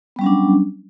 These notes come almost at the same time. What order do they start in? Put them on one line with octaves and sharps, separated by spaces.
B3 G3 C#4 F#3 D4